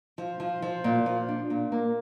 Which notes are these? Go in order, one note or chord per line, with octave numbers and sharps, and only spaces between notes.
F3
F3
F3
A#2
F3
D4
A#2
A#3